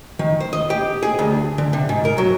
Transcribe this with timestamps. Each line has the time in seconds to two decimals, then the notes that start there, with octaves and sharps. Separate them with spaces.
0.19 D#3
0.40 C5
0.53 D#5
0.70 G4
1.03 G#4
1.19 D2
1.58 D3
1.73 C3
1.89 G#2
2.05 A#4
2.18 F#3